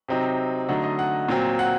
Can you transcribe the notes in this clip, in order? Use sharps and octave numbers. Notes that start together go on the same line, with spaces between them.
C3 F#3 C4 D#4
D3 F#3 A3 D#4 F#5
D#5
F#5
A#2 F#3 C4
F#5